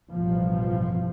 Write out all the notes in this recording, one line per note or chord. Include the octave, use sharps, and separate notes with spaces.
A1 G2 B2 F3